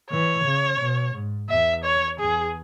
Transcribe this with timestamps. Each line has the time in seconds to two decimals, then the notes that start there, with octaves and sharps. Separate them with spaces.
0.10 E3 C#5
0.45 C#3
0.79 B2
1.14 G#2
1.49 E2 E5
1.84 C#5
2.19 E2 G#4